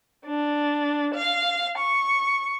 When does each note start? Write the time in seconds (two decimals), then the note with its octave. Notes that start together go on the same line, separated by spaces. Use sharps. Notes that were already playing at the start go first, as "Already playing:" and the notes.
0.25 D4
1.15 F5
1.77 C#6